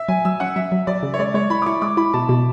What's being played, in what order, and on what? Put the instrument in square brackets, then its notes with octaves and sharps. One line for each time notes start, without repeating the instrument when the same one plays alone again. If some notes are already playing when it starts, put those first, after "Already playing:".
Already playing: [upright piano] E5
[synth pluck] F#3 [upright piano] G#5
[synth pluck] F#3 [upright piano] E6
[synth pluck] C#4 [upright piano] F#5
[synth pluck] F#3 [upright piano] E5
[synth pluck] F#3
[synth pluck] F#3 [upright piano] D5
[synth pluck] C#3
[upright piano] C#5
[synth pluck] G#3 [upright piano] D5
[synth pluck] G#3 [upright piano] C#5
[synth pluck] E4 [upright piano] B5
[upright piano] D6
[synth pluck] E4 [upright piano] C#6
[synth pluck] G#3 [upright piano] D6
[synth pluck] E4 [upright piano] B5
[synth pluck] B2 [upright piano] A5
[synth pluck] B2